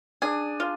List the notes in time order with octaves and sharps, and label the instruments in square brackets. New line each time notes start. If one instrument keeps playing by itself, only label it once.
[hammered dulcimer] D4 [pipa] G#4
[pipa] F4